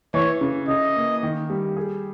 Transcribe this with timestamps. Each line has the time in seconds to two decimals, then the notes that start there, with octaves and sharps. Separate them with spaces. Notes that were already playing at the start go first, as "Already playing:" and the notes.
0.14 E3 C#5
0.41 C#3
0.68 C#3 D#5
0.96 A#3
1.23 D#3
1.50 G3
1.77 G#4